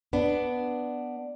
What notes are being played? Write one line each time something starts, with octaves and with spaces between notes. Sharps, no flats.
B3 D4